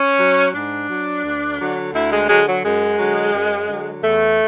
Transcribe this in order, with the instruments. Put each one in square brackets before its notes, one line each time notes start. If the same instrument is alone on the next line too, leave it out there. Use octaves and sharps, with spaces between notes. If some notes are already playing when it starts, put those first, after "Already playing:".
Already playing: [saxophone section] C#4
F#3
G#2 D4
F#3
D2
D3 F#3
D2 E4
G#3
D3 F#3 G#3
F#3
F#2 G#3
D3 F#3
F#2
D3 F#3
E2 A3